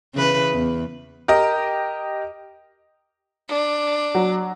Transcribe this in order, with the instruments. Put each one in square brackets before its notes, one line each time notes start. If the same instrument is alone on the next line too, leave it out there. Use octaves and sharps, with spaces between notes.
[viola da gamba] C#3 E3 B4
E2
[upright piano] G4 A#4 D#5
[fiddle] D4
[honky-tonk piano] F#3